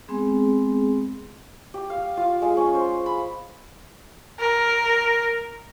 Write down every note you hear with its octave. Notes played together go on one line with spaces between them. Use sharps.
G#3 B3 C4 G#4
G4
F5
F4
G#3
C#4
C5
B5
A#4